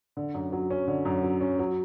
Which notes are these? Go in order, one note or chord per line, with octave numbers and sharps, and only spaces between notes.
D3
F#2
F#3
C#4
D3
F#2
F#3
C#4
F#3